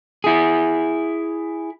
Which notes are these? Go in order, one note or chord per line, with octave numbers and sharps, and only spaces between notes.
E4 G#4